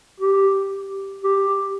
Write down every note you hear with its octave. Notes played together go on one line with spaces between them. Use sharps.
G4
G4